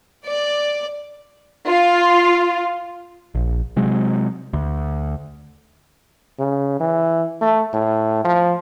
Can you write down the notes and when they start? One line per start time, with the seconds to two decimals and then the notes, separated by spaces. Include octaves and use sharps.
0.25 D5
1.68 F4
3.35 A#1
3.76 C3 F#3 G#3
4.53 D2
6.39 C#3
6.80 E3
7.41 A3
7.73 A2
8.24 F3